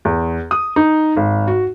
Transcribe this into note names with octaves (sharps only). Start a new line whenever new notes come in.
E2
D#6
D#4
G#1
F#4